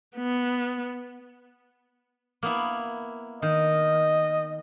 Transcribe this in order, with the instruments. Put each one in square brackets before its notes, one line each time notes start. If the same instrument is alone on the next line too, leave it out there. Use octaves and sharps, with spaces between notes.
[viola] B3
[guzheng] A#3 B3 E4
[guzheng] D#3 [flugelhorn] D#5